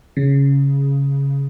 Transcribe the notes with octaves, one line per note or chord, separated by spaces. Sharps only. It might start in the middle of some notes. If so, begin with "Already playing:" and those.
C#3